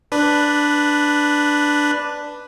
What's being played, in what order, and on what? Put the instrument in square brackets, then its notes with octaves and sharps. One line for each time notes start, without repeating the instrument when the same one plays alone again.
[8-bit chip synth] D4 B4